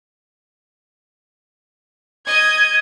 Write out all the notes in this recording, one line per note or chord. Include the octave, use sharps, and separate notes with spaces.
D#5 G#6